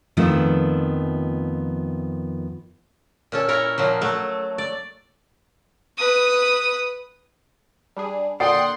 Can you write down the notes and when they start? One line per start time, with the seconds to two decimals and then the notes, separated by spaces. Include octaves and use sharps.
0.17 F2 D#3 F3 A3 B3
3.32 A#2 C#4 A4
3.48 E4 A#4 C#5
3.78 A#2 F3 F#3
4.01 F#3 A3
4.58 D5
5.97 B4 D#6
7.97 G3 D4 G#4
8.40 A#2 D3 D5 F#5 G5 C6 D#6 C7